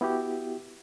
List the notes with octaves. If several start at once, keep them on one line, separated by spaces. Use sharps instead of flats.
B3 E4 F#4 G4